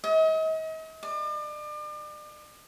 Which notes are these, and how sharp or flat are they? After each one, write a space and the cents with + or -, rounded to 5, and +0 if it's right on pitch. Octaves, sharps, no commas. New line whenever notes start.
D#5 +40
D5 +40